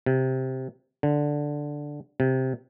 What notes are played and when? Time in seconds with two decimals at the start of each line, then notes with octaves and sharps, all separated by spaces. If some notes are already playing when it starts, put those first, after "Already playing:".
0.06 C3
1.03 D3
2.20 C3